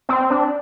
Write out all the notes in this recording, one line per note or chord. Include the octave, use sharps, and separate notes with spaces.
C4
D4